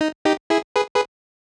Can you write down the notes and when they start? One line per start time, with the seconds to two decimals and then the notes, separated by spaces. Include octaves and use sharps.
0.01 D#4
0.25 D#4 G4
0.50 E4 G#4
0.76 G#4 B4
0.95 G#4 B4